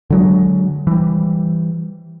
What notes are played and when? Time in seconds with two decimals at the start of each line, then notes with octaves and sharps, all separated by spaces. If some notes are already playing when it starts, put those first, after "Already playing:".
0.10 D3 F#3 G#3
0.87 E3 G3